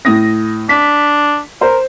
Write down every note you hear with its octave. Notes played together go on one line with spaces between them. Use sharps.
A2 D#6 A#6
D4 B6
A#4 C5